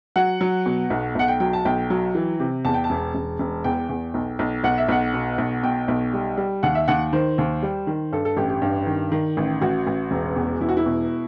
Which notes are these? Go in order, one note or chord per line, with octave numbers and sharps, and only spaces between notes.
F#3 F#5
F#3
B2
B1
B1 F#5
G5
F#3 G5
A5
B1 G5
F#3
E3
C3
E2 A5
G5
A5
E1
E1
E1
E2 G5
E2
B1
B1
B1 F#5
E5
B1 F#5
B2
B1
B2 G5
B1
G3
G3
D#2 F#5
E5
D#2 F#5
D#3 C5
D#2
G3
D#3
G2 A4
A4
A1 G4
G4
G2
D#3
D#3
A1
A1 F#4
A1
E1
E2
E1 E4
F#4
E4
B2